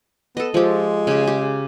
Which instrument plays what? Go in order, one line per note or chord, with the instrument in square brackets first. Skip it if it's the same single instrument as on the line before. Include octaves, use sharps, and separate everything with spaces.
[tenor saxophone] B3 [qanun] A4 D#5
[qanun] F3 G4 [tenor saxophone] G#3
[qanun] C#3 G4
G4